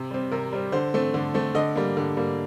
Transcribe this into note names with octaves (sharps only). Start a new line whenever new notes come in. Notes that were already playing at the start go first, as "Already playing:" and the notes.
Already playing: C3
G3 C4
C3 A#4
G3 C4
D3 C5
A3 C4
D3
A3 C4
D3 D#5
G3 A#3
D3
G3 A#3